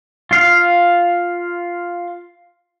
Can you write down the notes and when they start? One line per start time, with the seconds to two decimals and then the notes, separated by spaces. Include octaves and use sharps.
0.31 F4 F5